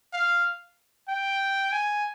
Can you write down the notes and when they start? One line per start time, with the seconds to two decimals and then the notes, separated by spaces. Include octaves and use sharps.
0.13 F5
1.08 G5
1.72 G#5